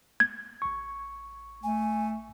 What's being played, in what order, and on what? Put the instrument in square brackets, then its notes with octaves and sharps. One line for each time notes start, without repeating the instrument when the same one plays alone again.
[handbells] G#6
[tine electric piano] A1 C#6
[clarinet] A3 [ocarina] G#5